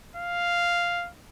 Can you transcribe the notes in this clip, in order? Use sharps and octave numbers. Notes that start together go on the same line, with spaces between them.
F5